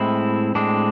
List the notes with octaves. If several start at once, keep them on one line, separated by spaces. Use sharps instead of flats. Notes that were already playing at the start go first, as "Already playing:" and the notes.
Already playing: A2 G#3 C4 E4
A2 G#3 C4 D4